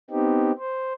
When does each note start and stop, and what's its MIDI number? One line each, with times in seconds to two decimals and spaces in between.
0.10 0.52 59
0.10 0.52 60
0.10 0.52 63
0.10 0.52 67
0.59 0.93 72